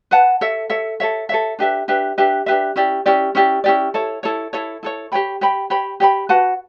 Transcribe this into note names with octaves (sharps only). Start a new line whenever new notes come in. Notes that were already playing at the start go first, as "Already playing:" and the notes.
B4 F#5 A5
A4 C#5 E5
A4 C#5 E5
A4 C#5 E5
A4 C#5 E5
D4 G4 B4 E5
D4 G4 B4 E5
D4 G4 B4 E5
D4 G4 B4 E5
C#4 E4 G4 D5
C#4 E4 G4 D5
C#4 E4 G4 D5
C#4 E4 G4 D5
E4 A4 C#5
E4 A4 C#5
E4 A4 C#5
E4 A4 C#5
G4 C#5 G5 B5
G4 C#5 G5 B5
G4 C#5 G5 B5
G4 C#5 G5 B5
F#4 B4 F#5 A5